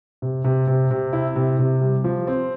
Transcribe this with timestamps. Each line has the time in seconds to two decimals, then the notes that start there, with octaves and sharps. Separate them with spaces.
0.22 C3
0.44 C3
0.67 C3
0.91 C3
1.13 E4
1.36 C3
1.59 C3
1.81 G3
2.04 F3
2.27 C4